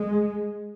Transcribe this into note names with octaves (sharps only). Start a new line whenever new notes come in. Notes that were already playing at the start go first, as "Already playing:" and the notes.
Already playing: G#3